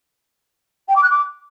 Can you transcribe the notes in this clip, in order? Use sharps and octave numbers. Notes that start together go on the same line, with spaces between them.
G5
D6
F#6
D6